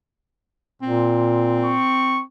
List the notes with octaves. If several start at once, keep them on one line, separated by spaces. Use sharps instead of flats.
A#2 C4
C#6